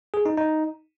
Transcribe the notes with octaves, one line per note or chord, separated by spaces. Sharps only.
G#4
D#4
D#4